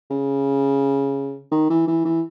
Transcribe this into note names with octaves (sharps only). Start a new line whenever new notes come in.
C#3
D#3
E3
E3
E3